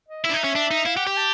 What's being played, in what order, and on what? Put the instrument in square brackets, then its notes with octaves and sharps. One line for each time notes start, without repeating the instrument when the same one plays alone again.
[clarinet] D#5
[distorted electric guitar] E4 [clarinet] E5
[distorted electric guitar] D4
D#4
C#4
D4
D#4
[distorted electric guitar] E4 [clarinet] F5
[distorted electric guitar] G4 [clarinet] F#5
[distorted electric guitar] G4 [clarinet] G5
[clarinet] A5